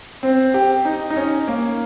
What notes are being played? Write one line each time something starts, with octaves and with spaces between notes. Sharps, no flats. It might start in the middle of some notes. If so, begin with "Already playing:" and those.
C4
G4
D#4
D#4
C#4
A#3